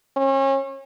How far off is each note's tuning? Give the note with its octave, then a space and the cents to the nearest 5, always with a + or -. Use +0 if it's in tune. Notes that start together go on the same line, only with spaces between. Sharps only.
C#4 -35